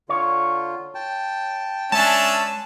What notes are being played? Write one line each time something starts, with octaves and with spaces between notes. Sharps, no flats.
D3 F4 C#5
G5 A5
G#3 C#4 D4 C#5 E5 G#5 A5